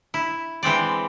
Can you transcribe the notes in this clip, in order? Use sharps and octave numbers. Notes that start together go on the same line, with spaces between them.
E4
E3 G#3 C4 D5